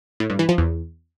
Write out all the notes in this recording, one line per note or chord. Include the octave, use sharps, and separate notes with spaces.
A2
G2
E3
F3
E2